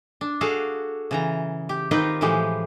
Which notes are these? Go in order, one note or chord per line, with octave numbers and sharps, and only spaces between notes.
D4
F#4 G#4 A4 D5 F5
C#3 E3 A#5
G4
D#3 C4 D#4 F4 G4 B4
A2 E3 F3 G#3 G4